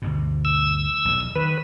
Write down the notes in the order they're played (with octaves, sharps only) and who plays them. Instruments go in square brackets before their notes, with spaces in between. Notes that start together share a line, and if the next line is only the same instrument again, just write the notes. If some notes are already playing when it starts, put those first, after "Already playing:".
[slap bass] D2 G2 B2
[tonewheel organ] E6
[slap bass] B1 E2
[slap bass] D#3 [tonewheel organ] B4